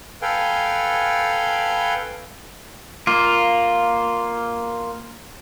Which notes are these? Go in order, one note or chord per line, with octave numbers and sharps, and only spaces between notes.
A4 B4 F5 G5 G#5
A#3 F4